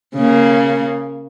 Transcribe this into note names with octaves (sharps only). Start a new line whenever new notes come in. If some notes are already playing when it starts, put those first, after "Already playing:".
C#3 A#3